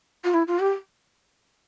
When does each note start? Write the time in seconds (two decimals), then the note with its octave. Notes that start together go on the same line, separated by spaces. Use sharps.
0.24 F4
0.34 E4
0.47 F4
0.59 G4